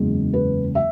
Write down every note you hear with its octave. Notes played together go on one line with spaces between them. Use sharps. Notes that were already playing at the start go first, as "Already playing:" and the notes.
Already playing: F#1 E2 C#3 G#3
B4
E5